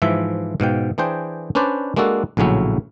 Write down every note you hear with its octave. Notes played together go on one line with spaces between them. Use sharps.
G#2 E3 F3 E5
G#2 B2 F5 G5
E3 D4 G#4 C5 G5
C#4 D4 B4 C5 D5
G#3 A#3 D4 F#4 A4
A#1 A2 C#3 F#3 C#4 E4